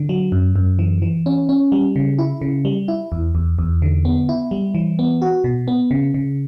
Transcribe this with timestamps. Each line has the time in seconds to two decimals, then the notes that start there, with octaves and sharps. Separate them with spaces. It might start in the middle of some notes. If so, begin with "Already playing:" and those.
Already playing: D3
0.09 F#3
0.32 F#2
0.56 F#2
0.79 E3
1.02 E3
1.26 C#4
1.49 C#4
1.72 G3
1.96 C#3
2.19 E4
2.41 C#3
2.65 G3
2.88 E4
3.12 E2
3.35 E2
3.59 E2
3.82 D3
4.05 B3
4.29 E4
4.51 G3
4.75 E3
4.99 B3
5.22 F#4
5.44 B2
5.68 B3
5.91 C#3
6.14 C#3